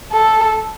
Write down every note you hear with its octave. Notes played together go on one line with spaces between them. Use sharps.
A4